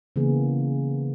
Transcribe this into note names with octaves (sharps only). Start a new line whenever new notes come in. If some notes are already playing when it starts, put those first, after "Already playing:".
C#3 E3 A#3 B3 G#4